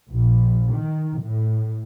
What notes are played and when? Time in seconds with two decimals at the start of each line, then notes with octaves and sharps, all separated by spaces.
0.11 A#1
0.74 D#3
1.22 A2